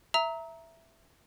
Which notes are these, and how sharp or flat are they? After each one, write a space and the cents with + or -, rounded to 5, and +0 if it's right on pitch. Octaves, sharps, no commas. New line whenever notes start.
E5 +5 A#5 +0 E6 -45